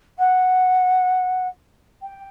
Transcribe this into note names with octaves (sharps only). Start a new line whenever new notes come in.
F#5
G5